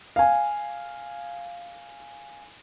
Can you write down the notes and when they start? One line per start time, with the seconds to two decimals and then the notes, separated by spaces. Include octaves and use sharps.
0.16 F5 G#5